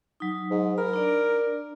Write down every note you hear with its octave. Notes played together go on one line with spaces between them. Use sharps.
F#3 D#4
G#2
A#4 B5
D4 D5